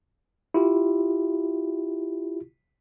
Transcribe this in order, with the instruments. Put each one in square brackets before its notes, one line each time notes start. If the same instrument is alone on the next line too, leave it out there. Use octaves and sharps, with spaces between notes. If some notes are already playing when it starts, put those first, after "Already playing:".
[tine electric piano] E4 F4 G4